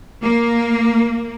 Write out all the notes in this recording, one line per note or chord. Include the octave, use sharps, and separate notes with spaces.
A#3